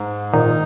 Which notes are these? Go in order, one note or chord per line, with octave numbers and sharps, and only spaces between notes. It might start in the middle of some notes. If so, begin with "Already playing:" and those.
Already playing: G#2
A#2 D#3 D#4